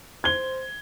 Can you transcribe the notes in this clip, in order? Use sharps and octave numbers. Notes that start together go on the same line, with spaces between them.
C5 G#6 G7